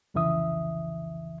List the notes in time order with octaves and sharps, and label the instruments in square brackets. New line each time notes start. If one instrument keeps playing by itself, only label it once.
[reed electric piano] C2 F2 C#3 E3 E5 D#6